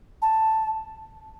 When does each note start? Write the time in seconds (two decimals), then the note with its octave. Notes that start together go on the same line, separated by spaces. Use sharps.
0.22 A5